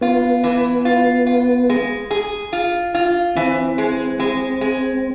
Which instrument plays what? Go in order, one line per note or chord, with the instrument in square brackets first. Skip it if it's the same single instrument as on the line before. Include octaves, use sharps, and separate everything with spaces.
[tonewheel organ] B3 [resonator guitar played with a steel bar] F4
[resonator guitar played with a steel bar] E3
F4
F4
G#3
G#4
F4
F4
[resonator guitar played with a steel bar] E3 [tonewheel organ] C4
[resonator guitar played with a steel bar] G#3
G#3
G#3